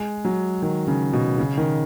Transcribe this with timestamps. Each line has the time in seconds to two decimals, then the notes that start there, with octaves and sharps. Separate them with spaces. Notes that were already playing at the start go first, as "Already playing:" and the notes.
Already playing: G#3
0.25 F#3
0.62 D#3
0.87 C#3
1.13 B2
1.38 C#3
1.57 D#3